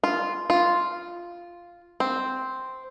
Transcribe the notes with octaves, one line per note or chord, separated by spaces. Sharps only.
F4
F4
C4